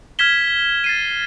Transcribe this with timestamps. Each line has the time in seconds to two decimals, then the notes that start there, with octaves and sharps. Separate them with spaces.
0.19 F6 G#6 B6 E7 G7
0.84 A6 C7 D#7